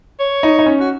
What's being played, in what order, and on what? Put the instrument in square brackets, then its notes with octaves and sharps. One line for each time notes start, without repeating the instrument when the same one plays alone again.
[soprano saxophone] C#5
[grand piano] D#4
D#4
C#4
[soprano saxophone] F#4